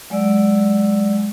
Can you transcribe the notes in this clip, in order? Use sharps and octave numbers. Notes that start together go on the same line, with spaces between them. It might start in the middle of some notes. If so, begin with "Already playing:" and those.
F#3 G#3 D5 E6